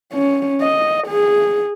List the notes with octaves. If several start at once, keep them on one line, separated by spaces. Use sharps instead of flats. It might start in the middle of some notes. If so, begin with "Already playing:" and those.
C#4
D#5
G#4